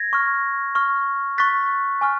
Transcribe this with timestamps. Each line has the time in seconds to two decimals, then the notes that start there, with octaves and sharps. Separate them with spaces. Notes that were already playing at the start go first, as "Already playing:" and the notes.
Already playing: G#6 A#6
0.13 C#6 F6
0.75 C#6 F6
1.38 C#6 F#6 A6 B6
2.01 G#5 C#6 F6